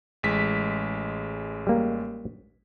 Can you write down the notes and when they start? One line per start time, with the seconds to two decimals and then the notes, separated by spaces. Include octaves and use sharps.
0.23 A1 G#3 B6
1.67 G3 A#3